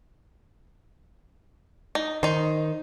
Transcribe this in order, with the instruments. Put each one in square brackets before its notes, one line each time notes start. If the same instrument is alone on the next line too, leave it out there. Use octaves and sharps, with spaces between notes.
[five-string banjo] D#4
[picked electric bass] D#3 [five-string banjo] D#4 C5